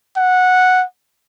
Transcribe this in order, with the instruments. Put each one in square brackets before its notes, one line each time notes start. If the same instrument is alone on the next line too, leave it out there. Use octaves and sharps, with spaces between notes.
[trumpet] F#5